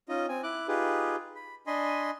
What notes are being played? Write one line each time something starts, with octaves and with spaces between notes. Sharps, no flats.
C#4 D#4 F4 D#5
C4 G#5
E4 D6 F#6
D#4 F4 G4 G#4 B4
B5
D4 D#5 G#5 B5 C6